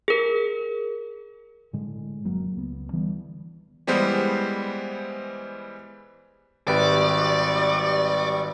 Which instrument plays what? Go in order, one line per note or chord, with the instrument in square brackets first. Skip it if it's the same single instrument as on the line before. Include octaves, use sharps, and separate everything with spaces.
[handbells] G#4 A#4
[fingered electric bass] A2 D3 G#3
F#1 F#3 A#3
C#2 B3
D3 E3 G3 B3
[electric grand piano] E3 G3 G#3 B3 C5
[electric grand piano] G#1 G4 B4 [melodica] G3 C#6 [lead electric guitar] D5